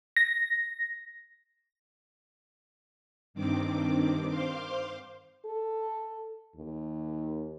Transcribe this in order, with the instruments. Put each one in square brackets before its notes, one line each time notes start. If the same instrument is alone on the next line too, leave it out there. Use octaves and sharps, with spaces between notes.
[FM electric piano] A#6
[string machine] G2 D#3 C4 D6
C5 F5 C6 D6
[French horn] A4
D#2